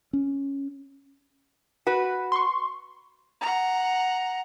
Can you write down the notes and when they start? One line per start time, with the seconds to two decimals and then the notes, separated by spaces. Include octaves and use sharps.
0.13 C#4
1.87 F#4 B4
2.32 C6 C#6
3.41 F#5 A#5